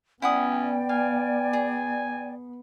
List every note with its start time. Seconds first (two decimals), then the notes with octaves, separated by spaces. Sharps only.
0.22 B3 C#4 E4 D5 F#5 G5 D#6
0.89 F5 G#5
1.53 G#4